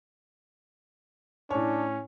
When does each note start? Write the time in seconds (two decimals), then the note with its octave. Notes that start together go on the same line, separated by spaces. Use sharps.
1.50 A2 C#4 D4 C#5